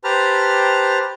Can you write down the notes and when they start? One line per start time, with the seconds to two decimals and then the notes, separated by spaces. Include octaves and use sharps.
0.04 G4 B4 C5 A5 A#5 F6